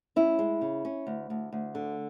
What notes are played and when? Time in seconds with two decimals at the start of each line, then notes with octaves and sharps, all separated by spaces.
0.16 C#4 E4
0.39 G#3
0.61 C#3
0.85 C#4
1.07 D2
1.30 D2
1.53 D2
1.75 D3